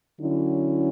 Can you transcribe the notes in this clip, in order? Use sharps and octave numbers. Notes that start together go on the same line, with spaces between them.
D3 F#3 C#4 E4